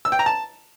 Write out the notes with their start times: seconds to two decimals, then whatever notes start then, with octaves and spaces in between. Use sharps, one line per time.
0.05 E6
0.12 G5
0.19 A#5
0.26 A5